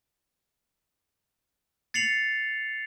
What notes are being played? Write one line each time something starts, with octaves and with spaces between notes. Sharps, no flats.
A6 C7 C#7 F7 F#7